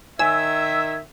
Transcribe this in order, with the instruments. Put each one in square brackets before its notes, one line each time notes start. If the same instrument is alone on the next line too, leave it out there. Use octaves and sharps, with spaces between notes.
[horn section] D#3 E5 [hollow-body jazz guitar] C#5 G#5 [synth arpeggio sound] E6 [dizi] G#6